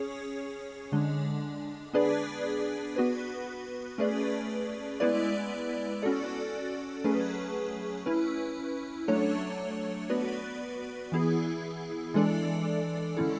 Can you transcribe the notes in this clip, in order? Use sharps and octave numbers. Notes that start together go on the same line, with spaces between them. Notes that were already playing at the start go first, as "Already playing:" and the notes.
Already playing: C#4 G#4 C#5
D3 G#3 D4
B3 D4 G#4 B4 D5
B3 F#4 B4
A3 C#4 G#4 B4 D5
G#3 B3 E4 B4 D5
C#4 F#4 A4 D5
F#3 A3 C#4 G#4 B4
C#4 E4 B4
F#3 A3 D4 A4 C#5
B3 F#4 B4 D5
E3 B3 E4 G#4
E3 G#3 D4 A4 D5
D3 G#3 C#4 E4 A4